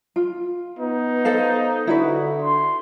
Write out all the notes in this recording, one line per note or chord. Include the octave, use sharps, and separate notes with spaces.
F4
B3 D#4
A4 C5 F5
D3 E4 F#4 B4
C6